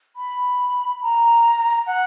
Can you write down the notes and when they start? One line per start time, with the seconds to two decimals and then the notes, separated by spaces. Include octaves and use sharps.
0.16 B5
1.02 A#5
1.87 F#5